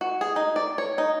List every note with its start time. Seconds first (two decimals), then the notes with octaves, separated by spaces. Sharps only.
0.01 F#4
0.21 G#4
0.36 D#4
0.56 D5
0.78 C#5
0.98 D#4